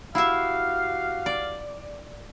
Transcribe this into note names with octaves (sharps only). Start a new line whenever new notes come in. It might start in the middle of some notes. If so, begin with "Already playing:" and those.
E4 F#4 G4 E5 F5
D5